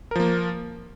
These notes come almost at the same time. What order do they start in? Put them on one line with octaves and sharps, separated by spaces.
A#4 F3 A#3